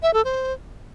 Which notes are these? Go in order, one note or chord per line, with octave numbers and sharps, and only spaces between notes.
E5
A4
C5